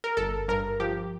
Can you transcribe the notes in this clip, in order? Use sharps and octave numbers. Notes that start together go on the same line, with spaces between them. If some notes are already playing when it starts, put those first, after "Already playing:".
A#4
G1 A4
G2 A#4
F3 G4